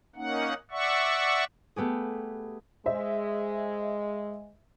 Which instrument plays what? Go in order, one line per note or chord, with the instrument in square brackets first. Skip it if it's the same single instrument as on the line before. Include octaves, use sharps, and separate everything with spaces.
[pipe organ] A#3 C#4 D#4 F#5
D5 E5 F#5 C#6
[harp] A3 B3 G4 G#4
[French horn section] G#3 [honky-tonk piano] C5 D#5 E5